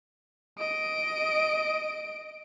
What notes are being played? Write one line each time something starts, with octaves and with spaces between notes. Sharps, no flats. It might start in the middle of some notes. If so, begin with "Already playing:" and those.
D#5 D7